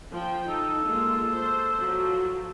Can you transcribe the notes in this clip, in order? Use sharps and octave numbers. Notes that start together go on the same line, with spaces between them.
F3 G5
D#4 A4
G#3 A#3 F4
C5
F3 F#3